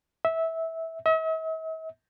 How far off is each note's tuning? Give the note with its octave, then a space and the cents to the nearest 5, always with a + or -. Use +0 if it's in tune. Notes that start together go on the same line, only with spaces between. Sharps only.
E5 -15
E5 -45